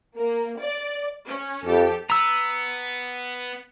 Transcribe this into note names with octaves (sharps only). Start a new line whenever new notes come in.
A#3
D5
C#4
F2 G4 A4
B3 A#5 E6